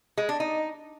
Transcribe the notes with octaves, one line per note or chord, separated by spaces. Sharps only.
G#3
D4
D#4